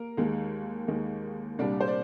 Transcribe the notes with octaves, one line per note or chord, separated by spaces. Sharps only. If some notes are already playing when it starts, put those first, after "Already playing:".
Already playing: A#3 A#4
D#2 D#3 G#3
D#2 D#3 G#3
C2 A#2 G3 D4 D5
C5
D5